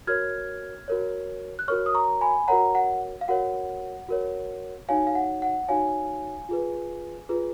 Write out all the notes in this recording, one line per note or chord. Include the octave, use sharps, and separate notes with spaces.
F#4 A#4 C#5 F6 G#6
F#4 A#4 C#5
F#6
F#4 A#4 C#5 C#6 F6
D#6
A#5 C#6
G#5 B5
F#4 A#4 C#5 F#5 A#5
F#5
F5
F#4 A#4 C#5 F#5
F#4 A#4 C#5
D#4 F#4 C#5 F5 G#5
F5
F#5
F#5
D#4 F#4 C#5 F5 G#5
F4 G#4 B4
F4 G#4 B4